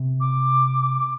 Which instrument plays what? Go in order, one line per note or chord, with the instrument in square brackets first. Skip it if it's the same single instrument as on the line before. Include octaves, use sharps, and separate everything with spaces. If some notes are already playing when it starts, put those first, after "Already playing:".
Already playing: [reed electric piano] C3
[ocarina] D6